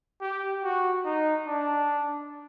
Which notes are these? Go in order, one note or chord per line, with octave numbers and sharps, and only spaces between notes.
G4
F#4
D#4
D4